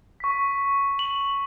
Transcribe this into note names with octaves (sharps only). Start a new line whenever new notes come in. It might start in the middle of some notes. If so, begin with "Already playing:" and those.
C#6 B6
F#7